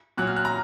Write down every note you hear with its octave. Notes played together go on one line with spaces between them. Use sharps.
A#2 F#3 F#6
F6
F#6
A#5